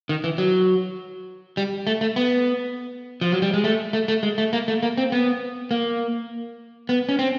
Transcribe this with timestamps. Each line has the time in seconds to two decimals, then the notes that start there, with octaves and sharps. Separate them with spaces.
0.09 D#3
0.24 E3
0.38 F#3
1.57 G3
1.87 A3
2.01 A3
2.16 B3
3.21 F3
3.32 F#3
3.42 G3
3.54 G#3
3.64 A3
3.93 A3
4.08 A3
4.23 G#3
4.38 A3
4.53 A#3
4.68 A3
4.83 A#3
4.98 C4
5.12 B3
5.71 A#3
6.89 B3
7.09 C#4
7.19 C4